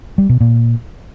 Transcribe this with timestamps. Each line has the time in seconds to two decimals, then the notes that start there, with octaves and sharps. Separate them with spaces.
0.18 G3
0.29 B2
0.41 A#2